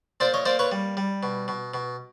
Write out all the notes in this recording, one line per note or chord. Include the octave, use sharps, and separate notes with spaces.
A#2 C5 D5
C#5 D#5
A#3 C5 D5
B4 C#5
G3
G3
B2
B2
B2